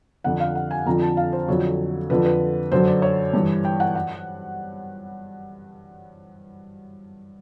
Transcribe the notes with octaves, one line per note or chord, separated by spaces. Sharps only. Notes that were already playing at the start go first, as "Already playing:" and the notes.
F2 D3 F3 F#5
F5
F#5
G#5
F2 D3 F3 A#5
A5
F5
C5
F2 D3 F#3 C#5
F2 D3 F3 B4
B4
F#2 D3 F#3 C5
D5
C#5
G2 E3
G5
F#5
F#5